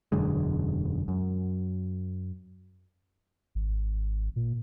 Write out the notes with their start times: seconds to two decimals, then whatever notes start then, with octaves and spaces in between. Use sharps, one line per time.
0.12 E1 F#2 D3 G#3
1.08 F#2
3.55 G#1
4.36 A#2